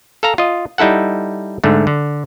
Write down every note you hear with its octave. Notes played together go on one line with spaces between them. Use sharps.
A4 F5 A#5
F4 D#5
G3 D#4 E4 A4 F#5
G#2 D3 A3
D3